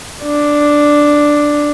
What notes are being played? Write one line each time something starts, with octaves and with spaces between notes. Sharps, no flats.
D4